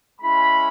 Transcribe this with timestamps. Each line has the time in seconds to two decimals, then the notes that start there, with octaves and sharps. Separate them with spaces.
0.20 G#3 C#4 E4 B5